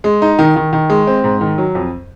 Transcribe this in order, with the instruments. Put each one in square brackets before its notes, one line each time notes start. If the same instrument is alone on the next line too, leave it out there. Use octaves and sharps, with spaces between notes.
[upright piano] G#3
D#4
D#3
D#3
D#3
G#3
C4
G#2
D#3
F#3
F2